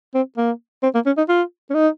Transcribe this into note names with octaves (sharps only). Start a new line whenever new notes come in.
C4
A#3
C4
A#3
C#4
D#4
F4
C#4
D#4